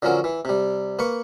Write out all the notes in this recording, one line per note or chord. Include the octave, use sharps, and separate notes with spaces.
D3 F3 F#3 C#4 A#4
E3
C3 G3
A#3 B4 C#6